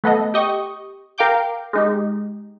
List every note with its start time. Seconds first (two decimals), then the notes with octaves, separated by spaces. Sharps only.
0.04 A3 B3 A4 D#5
0.34 G4 D#5 C#6
1.18 A#4 F5 G5 D6 G6
1.73 G#3 D#4 G4